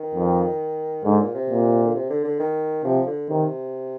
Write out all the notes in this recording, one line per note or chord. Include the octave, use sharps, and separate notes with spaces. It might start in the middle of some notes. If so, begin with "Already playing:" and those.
Already playing: D#3
F2
G#2 D3
A#2
C3
A#2
D3
C3
D3
D3
D#3
C3 F3
D3
C3 D#3